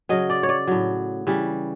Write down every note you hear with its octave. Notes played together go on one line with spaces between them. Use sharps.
C#3 F#3 D#5
D5
C#5
D5
A2 F#3
C#3 E3 G3